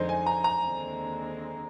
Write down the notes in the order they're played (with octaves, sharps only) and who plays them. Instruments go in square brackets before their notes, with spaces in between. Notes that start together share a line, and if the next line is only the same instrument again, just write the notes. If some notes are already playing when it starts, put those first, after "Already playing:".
Already playing: [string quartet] F2 D3 G#3 D#4 [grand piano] C5
[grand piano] G#5
A#5
A#5
[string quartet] D#2 D3 G#3 C4